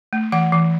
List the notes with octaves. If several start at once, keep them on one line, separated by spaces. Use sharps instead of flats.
A3
E3 F#5
E3